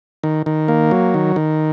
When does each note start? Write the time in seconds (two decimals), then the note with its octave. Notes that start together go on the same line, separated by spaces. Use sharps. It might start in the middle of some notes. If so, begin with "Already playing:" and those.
0.23 D#3
0.46 D#3
0.68 A#3
0.91 F#3
1.14 D#3
1.36 D#3